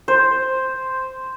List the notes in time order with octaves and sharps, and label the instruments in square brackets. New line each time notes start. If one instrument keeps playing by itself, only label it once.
[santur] C5